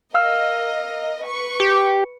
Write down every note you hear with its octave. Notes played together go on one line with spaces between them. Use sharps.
A#4 D#5 F5 E6 F6
B4 C#6
G4 C#7